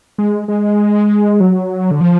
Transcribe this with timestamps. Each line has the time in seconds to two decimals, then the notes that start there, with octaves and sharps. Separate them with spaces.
0.18 G#3
0.48 G#3
1.40 F#3
1.91 D3
2.01 F3